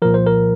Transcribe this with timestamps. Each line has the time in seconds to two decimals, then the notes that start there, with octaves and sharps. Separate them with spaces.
0.02 C2 A#2 F3 A#4
0.14 C5
0.26 A#4